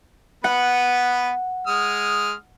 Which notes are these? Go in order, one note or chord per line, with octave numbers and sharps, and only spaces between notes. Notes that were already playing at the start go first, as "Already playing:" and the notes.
B3 B4 F#5
G#3 D#6 F6